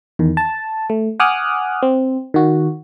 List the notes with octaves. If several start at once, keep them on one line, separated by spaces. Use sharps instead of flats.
E2 D#3
A5
A3
F#5 G#5 D6 D#6 F6 F#6
C4
D#3 F#4